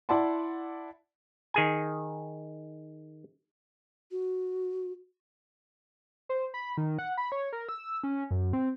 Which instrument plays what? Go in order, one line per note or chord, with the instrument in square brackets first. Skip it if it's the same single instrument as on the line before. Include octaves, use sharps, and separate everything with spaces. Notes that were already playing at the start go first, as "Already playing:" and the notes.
[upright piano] E4 D5 F#5 A5 C6
[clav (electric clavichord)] D#3 G#4 G#5
[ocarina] F#4
[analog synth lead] C5
B5
D#3
F#5
B5
C#5
A#4
E6
C#4
F#2
C4